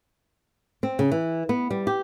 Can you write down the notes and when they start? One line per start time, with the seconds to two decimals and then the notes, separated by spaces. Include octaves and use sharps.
0.83 C4
0.99 C#3
1.12 E3
1.49 B3
1.71 G3
1.87 G4